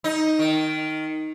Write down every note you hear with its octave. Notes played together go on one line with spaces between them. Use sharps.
D#4
D#3